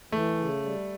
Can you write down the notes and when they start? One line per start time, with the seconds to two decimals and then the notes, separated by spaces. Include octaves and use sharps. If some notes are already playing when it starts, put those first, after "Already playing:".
0.12 E3 A3
0.38 C#3
0.63 G3